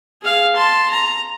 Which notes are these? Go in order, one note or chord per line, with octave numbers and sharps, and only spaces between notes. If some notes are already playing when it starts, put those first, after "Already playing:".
G#4 F5
A5 C6
A#5